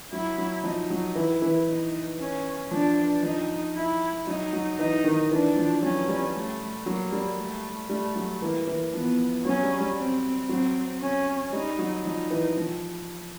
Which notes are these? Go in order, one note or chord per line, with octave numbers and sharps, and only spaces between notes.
F#3 E4
F#3
F3 D#4
F#3
E3 E4
E3
D#4
C#4
F3 D4
F3 D#4
E4
F#3 D#4
F#3
E3 D#4
D#3
E3 D4
F3
F#3 C#4
G3
A3
F#3 A#3
G3
A3
G3 A3
F#3
E3 A#3
E3
F3 B3
F#3 C#4
G3
G3
C4
F#3 C4
C#4
G3 D#4
F#3
F3 D#4
E3
F3